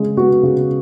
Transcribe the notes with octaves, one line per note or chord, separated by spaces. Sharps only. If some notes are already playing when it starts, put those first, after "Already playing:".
Already playing: C#3 G#3
B3 F#4
C#3